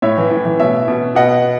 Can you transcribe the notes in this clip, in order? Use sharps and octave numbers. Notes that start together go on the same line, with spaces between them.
A2 C#5 E5
E3
A2
E3
B2 C#5 E5
B2
B2 D#5 F#5